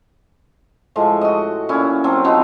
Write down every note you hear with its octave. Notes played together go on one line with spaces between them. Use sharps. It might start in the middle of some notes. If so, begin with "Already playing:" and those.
A2 F3 G#3
F#4 D#5
A#2 C#4 E4
F#3 C4 A4
F3 B3 C4 D#4